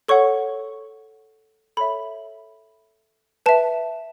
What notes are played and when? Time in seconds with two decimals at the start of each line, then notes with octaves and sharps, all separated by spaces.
0.08 A4 C#5 F#5 C#6
1.77 A4 C#5 E5 B5
3.46 B4 E5 A5